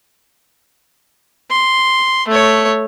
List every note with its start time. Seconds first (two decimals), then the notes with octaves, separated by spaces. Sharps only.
1.51 C6
2.28 A3 C#5